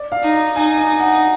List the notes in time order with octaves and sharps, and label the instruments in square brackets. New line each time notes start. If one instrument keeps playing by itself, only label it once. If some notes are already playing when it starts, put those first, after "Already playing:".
Already playing: [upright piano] D5
F5
[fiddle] D#4
[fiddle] D#4 [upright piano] G#5
[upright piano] G#5
F#5